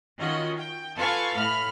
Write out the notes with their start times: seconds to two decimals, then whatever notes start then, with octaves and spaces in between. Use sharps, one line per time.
0.18 D#3 C#4 F4 F#4 D#5
0.58 G5
0.97 F4 A4 B4 F5 G#5 C#6
1.35 A2 B5 F6